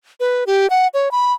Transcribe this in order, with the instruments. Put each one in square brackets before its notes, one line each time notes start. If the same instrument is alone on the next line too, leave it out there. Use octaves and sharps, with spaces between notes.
[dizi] B4
G4
F#5
C#5
B5